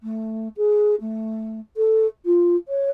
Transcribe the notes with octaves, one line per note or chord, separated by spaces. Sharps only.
A3
G#4
A3
A4
F4
C#5